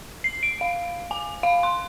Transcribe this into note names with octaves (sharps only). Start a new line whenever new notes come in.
C7
D7
F5
G#5
F5
C6